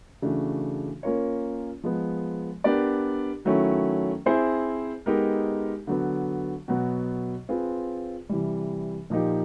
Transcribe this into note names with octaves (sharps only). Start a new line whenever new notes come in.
C#3 E3 A3 D4 F#4
A#3 C#4 F4 A#4 C#5
F3 G#3 B3
B3 D4 G4 A#4 D5
D#3 F#3 A3 C#4 E4
C4 E4 G#4 C5
G#3 B3 D#4 G4 A#4
D3 F#3 B3
B2 F#3 B3
C4 F4 G#4 B4
C3 E3 G3
A#2 F3 A#3 D#4 G4